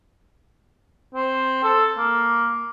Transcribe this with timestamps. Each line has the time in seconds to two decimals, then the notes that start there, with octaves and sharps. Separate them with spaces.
1.15 C4
1.64 A4
1.98 A#3